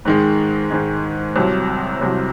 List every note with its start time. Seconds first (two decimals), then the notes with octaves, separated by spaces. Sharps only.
0.05 G#2 D#3 G#3
0.70 G#2 D#3 G#3
1.36 C2 C3 F#3
2.01 C2 C3 F#3